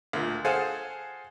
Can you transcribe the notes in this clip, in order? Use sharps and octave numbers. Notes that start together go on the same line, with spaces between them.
D2 A#2
G#4 A4 C5 F5 F#5 G#5